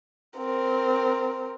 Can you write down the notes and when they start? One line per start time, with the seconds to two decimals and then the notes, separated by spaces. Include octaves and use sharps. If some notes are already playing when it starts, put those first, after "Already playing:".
0.38 C4 A#4